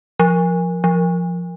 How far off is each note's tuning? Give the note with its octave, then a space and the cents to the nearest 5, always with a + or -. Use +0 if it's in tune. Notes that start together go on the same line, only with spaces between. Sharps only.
F3 +5
F3 -5